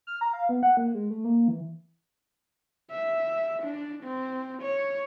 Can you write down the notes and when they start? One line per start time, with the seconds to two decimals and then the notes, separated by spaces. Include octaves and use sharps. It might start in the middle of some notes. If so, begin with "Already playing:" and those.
0.07 F6
0.21 A#5
0.33 F5
0.49 B3
0.63 F#5
0.77 A#3
0.94 G#3
1.11 A3
1.25 A#3
1.48 E3
2.91 E5
3.63 D4
4.04 C4
4.62 C#5